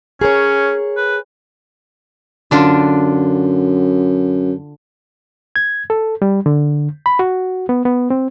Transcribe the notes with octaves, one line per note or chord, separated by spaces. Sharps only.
C#4 G#4 A#4 C#5
B4
F#2 D3 D4 F4
G#6
A4
G3
D3
B5
F#4
B3
B3
C4